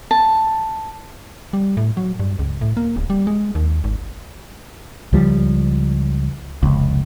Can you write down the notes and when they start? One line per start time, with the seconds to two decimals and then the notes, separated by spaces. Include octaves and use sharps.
0.11 A5
1.53 G3
1.77 A2
1.97 F#3
2.20 G2
2.39 C#2
2.61 A2
2.77 A#3
2.96 D1
3.10 G3
3.27 G#3
3.55 D#2
3.84 G#1
5.13 C#2 F3 G3
6.63 F1 C#2